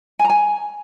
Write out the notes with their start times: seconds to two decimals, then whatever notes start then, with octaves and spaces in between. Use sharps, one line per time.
0.19 G#5
0.24 A#5
0.30 G#5